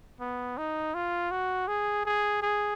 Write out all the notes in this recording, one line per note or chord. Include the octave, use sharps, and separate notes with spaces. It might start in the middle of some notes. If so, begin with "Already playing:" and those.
B3
D#4
F4
F#4
G#4
G#4
G#4